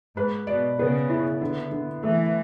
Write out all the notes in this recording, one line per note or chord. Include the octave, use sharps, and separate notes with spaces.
G#2 B4
B2 D5
C#3 B3
E4
D3
D3
E3 A3